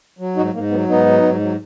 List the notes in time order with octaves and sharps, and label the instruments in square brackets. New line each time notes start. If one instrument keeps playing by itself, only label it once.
[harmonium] F#3
G#2 D#4 F#4
G#2 A#3
F#3 B3
G#2 B3 D#4
F#3
G#2
F#3